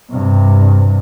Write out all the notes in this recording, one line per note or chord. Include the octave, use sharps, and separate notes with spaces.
G2 C3